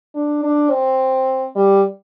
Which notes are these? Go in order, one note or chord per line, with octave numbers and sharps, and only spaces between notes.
D4
D4
C4
G3